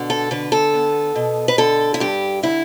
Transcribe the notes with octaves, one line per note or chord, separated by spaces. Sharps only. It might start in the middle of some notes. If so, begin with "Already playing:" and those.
Already playing: B2 D3
A4
D3 B4
A4
B3
B2
B4
D3 A4
E4
G2 G4
D3 E4